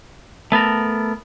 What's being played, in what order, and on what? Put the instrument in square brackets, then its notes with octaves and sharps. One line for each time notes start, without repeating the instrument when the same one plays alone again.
[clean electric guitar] A3 B3 A4 A#4